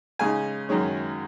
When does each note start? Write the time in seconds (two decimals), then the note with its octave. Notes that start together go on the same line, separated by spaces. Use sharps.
0.19 C#3 G#3 D#4 G#5
0.69 F#2 D#3 G#3 C#4